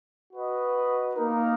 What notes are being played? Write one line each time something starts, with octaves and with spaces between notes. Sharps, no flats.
F#4 B4 D#5
A#3 D#4 A#4